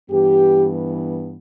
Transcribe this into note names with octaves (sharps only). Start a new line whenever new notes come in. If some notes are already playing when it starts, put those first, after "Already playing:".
G2 E3 B3 G4